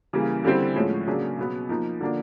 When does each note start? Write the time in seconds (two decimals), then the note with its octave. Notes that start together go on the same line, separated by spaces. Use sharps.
0.13 C#3 E3 G3 A#3
0.44 D3 G3 C4 E4
0.76 A2 F3 G#3 C#4
1.07 C#3 F#3 A#3 D4
1.38 B2 F#3 B3
1.69 F3 A#3 D#4
2.00 D3 F3 A#3 D4